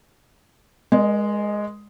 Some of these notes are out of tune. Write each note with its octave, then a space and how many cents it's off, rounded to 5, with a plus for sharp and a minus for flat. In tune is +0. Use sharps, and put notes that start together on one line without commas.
G#3 +0 A#4 +35 D5 +45